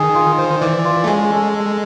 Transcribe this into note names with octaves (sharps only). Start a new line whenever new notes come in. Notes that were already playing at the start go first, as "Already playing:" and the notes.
Already playing: D#3 G#4
F4
C5
E3 D5
F4
A3
G#3 C#4
A4
A4